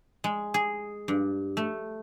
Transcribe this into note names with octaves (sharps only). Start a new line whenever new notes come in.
G#3
G#4
G2
A3